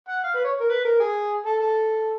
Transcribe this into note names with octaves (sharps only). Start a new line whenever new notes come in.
F#5
F5
B4
C#5
A#4
B4
A#4
G#4
A4
A4